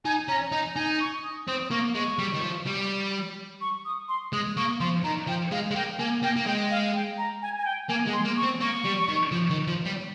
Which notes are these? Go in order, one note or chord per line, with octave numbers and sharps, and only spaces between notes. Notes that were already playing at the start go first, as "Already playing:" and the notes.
D#4 G#5
C#4 A#5
D#4 A#5
D#4 G#5
C#6
D#6
C4 D#6
A#3 C#6
G#3 C#6
G3
D#3
F3
G3
C#6
D#6
C6
G#3 D#6
A#3 C#6
F3 C6
D#3 A#5
F3 G5
G#3 F5
G#3
A#3 G5
A#3 G#5
A#3 G5
A#3
G#3 G5
F5
G5
A#5
G#5
G#5
G5
A#3 G#5
G#3
C6
A#3
C#6
C4
A#3 C#6
G3
D#3
F3
D#3
F3
G3